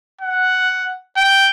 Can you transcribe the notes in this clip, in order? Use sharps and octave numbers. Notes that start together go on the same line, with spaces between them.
F#5
G5